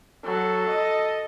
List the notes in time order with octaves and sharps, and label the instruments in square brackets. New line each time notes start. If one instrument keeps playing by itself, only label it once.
[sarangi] F#3 [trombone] A4
[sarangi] D#5